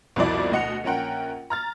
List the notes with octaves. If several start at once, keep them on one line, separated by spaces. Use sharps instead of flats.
C2 F2 B2 E4 D5
D2 B2 D#5 F#5 C#7 F7
A#1 C#4 A#4 F#5 G5
A#5 F6 A6